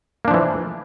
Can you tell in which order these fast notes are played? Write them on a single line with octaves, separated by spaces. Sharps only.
A#3 D4 F3 E3